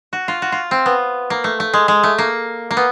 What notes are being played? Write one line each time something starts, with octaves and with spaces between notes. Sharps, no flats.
F#4
F4
F#4
F4
C4
B3
A#3
A3
A3
G#3
G#3
A3
A#3
A#3
B3